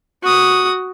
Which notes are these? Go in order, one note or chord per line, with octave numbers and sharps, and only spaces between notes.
F#4 D#6